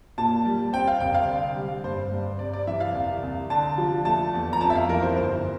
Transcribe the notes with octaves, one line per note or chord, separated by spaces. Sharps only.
A#2 A5
G3
C4 G5
F5
C2 G5
F5
D3
G3
G2 C5
G2
C3 D5
D5
E3 E5
F5
C2
C2
D3 A5
F3
A3 A5
E2
A#5
F2 A5
E5
F5
E3 A#4
C5
G1 C5